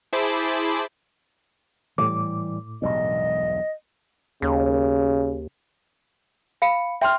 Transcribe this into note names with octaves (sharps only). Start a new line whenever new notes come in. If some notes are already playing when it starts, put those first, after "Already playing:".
E4 G#4 C5 A5 B5 D6
A2 E3 G3 D6
E1 B1 G2 D#5
D#2 C#3
F5 B5 C#7
E5 G5 C6 F6